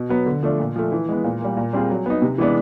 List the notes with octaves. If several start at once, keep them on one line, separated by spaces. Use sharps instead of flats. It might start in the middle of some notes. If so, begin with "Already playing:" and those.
Already playing: B2
F#3 B3
D3
F3 A3 D4
A#2
F3 A3
E3
G#3 B3
A#2
G3 A#3
A#2
G3 C4 F4 G#4
F#3
B3 D#4
C3
E3 G#3 B3 D4